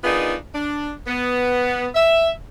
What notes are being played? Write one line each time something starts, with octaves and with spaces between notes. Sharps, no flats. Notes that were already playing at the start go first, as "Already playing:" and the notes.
D#3 B3 D4 D#4 F4 G#4
D4
B3
E5